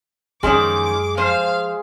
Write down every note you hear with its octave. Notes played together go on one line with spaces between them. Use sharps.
F#2 D#3 F3 G#3 C#4 G#4 D6
F3 C5 F5